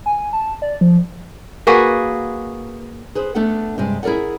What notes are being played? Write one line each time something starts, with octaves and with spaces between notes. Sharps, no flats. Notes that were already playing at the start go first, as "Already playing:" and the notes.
G#5
A5
D5
F3
A#3 F#4 G#4 B4
G#4 B4 C5
A3 B3 D4 A4 F#5
G2 C3 G#3
E4 G#4 A#4 D5 F#5